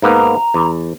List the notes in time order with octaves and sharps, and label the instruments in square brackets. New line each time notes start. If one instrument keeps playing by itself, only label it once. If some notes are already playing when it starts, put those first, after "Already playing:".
[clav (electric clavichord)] G#2 A#3 B3 [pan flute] A#5
[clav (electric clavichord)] E2